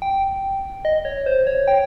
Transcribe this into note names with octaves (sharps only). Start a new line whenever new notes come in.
G5
D#5
C#5
C5
C#5
G5